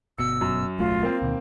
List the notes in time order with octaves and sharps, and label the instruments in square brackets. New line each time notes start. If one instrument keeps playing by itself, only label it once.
[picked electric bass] G1 B2 [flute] E6 [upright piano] C#7
[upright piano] F#2
[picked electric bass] D1 B1 A3 [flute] F4
[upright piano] A#3 C4
[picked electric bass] D2 B2 D#3